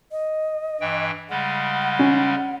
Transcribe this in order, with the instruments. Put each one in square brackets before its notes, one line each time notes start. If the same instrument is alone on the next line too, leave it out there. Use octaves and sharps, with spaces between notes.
[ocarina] D#5
[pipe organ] G2 E3 G5
[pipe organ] C#3 G3 G#3 [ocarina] F#5
[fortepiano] C#4